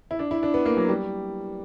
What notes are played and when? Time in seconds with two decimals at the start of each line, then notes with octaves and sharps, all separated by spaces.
0.11 E4
0.19 D4
0.31 E4
0.43 D4
0.54 B3
0.66 A#3
0.77 F#3
0.89 G3